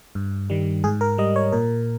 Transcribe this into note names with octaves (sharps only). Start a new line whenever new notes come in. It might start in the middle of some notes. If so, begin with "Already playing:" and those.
G2
D#3 G3
G#2 G#4
A#4
G3 D#5
C#5
A#2 A#4